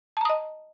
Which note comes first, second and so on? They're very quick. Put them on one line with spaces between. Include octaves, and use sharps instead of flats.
A5 A#5 D#6 D#5